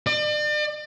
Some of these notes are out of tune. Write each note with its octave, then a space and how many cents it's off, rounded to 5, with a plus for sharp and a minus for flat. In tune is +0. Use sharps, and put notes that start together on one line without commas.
D5 +40